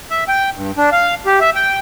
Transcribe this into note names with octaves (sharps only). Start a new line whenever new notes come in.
E5
G5
G2
D4
F5
G4
E5
G5